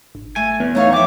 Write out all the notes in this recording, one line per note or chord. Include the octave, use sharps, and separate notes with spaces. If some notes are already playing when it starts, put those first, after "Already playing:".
G#1
A3 G#5
E2 B3
A3 D#4 C#5 F5
F3 E5 G5 D6